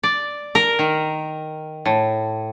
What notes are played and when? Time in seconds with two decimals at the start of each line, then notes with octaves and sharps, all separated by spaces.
0.03 D5
0.55 A#4
0.79 D#3
1.86 A2